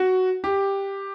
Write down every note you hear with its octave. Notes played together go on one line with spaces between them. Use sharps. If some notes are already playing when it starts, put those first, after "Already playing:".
Already playing: F#4
G4